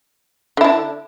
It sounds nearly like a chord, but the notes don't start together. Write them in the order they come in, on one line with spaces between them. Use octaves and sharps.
D3 E4 D4